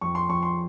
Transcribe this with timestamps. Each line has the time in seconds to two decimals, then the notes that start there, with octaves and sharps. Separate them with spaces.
0.01 F2 C#6
0.15 C6
0.29 F2 C#6
0.42 C6